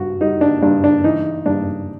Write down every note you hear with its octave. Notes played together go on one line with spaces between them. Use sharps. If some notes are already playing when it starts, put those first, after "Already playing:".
Already playing: G2 F#4
G3 D#4
D4
G2 D4
D4
E3 D#4
G2 D4